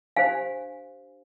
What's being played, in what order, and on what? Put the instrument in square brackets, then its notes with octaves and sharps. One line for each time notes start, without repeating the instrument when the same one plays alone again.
[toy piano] D4 G4 C5 F5 G#5